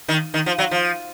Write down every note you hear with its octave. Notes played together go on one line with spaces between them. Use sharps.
D#3
D#3
F3
F#3
F3